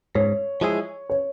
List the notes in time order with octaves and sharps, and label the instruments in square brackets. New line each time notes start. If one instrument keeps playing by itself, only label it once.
[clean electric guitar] G#2 [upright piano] C#5
[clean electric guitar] F3 G#3 E4 G#4
[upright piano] C#5